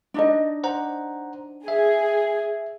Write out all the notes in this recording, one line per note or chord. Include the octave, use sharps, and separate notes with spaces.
D4 D#4 D#5
C5 F#5 A#5
G#4 E5